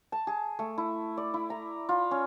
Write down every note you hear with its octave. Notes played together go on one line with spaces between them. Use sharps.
A5
G#4
A3
E4
D5
E4
A#5
F4
C#4